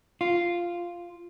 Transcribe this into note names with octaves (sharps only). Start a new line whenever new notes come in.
F4